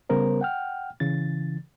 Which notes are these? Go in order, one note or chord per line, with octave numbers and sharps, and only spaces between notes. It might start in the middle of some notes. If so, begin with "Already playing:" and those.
C#3 G3 B3 A#4 C5
F#5 G5 F6
C#3 E3 A6